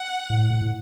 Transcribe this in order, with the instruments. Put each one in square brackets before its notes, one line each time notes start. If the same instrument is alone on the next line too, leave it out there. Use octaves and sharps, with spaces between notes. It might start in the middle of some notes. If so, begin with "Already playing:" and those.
Already playing: [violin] F#5
[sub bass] A2
A2
A2